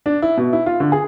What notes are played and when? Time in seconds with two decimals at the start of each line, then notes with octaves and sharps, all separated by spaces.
0.06 D4
0.22 E4
0.37 B2
0.53 E4
0.66 F4
0.80 D3
0.92 G#4